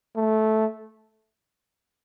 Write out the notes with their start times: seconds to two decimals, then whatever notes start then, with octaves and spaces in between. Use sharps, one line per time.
0.16 A3